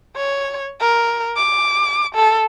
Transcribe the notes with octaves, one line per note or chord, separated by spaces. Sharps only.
C#5
A#4
D6
A4